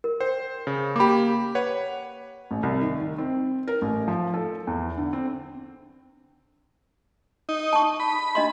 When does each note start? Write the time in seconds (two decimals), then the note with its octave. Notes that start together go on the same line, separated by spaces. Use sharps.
0.04 A#4
0.20 C5 G5
0.67 C#3
0.96 A#3 G4 B5 D6
1.55 B4 C#5 F#5
2.51 A1
2.63 C2
2.81 D#3
3.00 D#3
3.18 C4
3.68 A#4
3.82 A1
4.08 F3
4.34 A4
4.67 E2
4.97 D3
5.13 C4
7.49 D#4
7.73 A5 C#6
8.00 B5
8.35 D4 D#5 C6